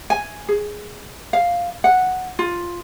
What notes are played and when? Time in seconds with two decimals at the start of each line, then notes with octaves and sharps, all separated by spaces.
0.10 G#5
0.48 G#4
1.33 F5
1.84 F#5
2.39 F4